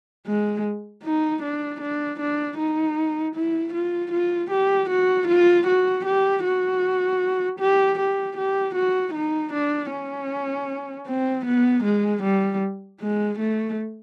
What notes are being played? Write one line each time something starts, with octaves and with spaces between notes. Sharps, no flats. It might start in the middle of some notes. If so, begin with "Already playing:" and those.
G#3
D#4
D4
D4
D4
D#4
E4
F4
F4
G4
F#4
F4
F#4
G4
F#4
G4
G4
G4
F#4
D#4
D4
C#4
C4
B3
G#3
G3
G#3
A3